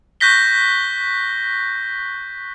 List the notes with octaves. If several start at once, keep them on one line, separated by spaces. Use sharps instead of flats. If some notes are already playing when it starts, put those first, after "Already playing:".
C#6 F#6 G6 A#6 B6 G7